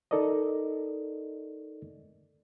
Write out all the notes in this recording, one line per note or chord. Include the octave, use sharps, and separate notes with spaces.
D#4 A4 A#4 D5 D#5